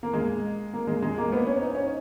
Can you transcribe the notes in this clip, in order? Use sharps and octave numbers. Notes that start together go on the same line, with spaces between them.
A#3
G#3
A#3
G#3
G#3
A#3
B3
C#4
D#4
C#4